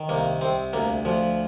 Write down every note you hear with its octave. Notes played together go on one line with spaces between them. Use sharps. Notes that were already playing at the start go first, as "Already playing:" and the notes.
Already playing: D#3
C2 A#3
C2 C4
D2 A#3
D2 F3